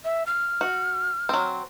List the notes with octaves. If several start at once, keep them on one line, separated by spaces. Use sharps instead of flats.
E5
F6
F#4
F#3 C4